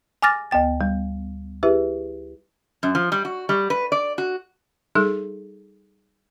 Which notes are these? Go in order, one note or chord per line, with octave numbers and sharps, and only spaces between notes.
G#5 D6 F6 A6 A#6
D2 B3 G5 A6
G3
E4 G4 G#4 B4 E5
F#2
F3
G3
F#4
G3
B4
D5
F#4
G3 D#4 G#4 A4